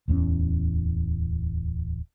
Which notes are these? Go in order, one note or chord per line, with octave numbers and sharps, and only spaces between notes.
D1 E2 G3 C#4